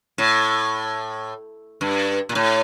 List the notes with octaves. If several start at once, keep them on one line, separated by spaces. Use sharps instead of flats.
A2
G2
A#2
A2